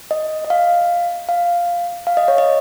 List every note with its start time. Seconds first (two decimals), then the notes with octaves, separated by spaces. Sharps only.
0.11 D#5
0.45 D#5
0.50 F5
1.29 F5
2.07 F5
2.17 D#5
2.28 C#5
2.38 D#5